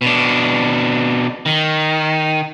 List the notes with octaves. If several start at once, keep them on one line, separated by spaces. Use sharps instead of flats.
B2 D4
D#3